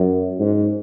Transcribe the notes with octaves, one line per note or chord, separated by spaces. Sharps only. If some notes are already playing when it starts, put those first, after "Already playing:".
Already playing: F#2
G#2